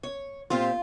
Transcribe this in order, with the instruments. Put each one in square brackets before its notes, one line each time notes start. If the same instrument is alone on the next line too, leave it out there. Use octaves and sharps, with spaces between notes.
[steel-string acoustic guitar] C#5
[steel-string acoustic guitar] A#2 C4 G4 [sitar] F4